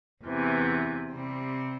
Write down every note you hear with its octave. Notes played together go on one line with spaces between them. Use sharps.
E2 C3 E3
C3 G3 C4